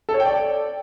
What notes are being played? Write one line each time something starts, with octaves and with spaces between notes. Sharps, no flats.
A4
C#5
G5
D5